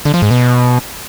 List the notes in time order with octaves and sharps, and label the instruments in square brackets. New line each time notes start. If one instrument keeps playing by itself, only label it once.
[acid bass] D3
F3
G#2
B2